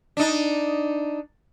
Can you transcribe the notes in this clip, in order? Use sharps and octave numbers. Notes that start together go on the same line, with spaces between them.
D4 D#4